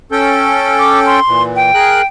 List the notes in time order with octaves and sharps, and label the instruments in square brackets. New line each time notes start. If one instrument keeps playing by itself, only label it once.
[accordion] C#4 A4 G5
[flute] D6
C6
[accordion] A#2 E3
[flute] G5
[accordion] G#4 A#4 F#6